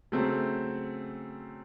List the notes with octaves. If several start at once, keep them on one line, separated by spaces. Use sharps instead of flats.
C#3 F#3 A3 C4